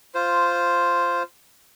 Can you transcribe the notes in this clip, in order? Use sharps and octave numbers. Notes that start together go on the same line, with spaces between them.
F4 C5